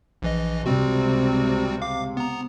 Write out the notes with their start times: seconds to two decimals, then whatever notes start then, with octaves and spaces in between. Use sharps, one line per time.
0.22 A#1 E3 D#5
0.66 C#2 C3 G3 C4 F#4
1.82 F5 D6
2.17 B3 A#5